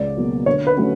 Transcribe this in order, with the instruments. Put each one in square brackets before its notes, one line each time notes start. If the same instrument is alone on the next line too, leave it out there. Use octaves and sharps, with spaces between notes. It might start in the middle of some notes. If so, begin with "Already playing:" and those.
Already playing: [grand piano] C#2 [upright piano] D5
[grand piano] B2 F#3 A#3
[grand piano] D3 [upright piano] C#5
[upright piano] B4
[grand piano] F#3 A3 C#4 F#4